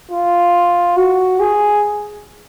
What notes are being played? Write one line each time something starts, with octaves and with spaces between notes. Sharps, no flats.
F4
F#4
G#4